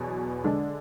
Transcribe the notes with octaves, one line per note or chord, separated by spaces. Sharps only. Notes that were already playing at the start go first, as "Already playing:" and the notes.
Already playing: E2 B2 F#3 B3
D3 G#3 D4